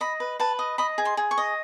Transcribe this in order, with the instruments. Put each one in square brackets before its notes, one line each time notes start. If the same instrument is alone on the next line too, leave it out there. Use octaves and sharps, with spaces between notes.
[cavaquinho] D#5 B5
B4
B4 A5
D#5
D#5 B5
G#4
C6
G#4
C#6
D#5